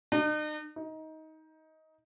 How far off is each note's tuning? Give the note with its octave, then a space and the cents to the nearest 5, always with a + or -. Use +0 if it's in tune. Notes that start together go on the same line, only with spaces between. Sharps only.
D#4 -40
D#4 +20